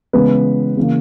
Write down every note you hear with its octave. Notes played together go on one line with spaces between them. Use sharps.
C#3 E3 G#3 B3 B4
C#3 E3 A#3